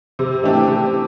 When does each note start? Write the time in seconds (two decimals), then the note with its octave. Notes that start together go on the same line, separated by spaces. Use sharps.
0.19 C3
0.43 E3 A3 D4 G4
0.68 C3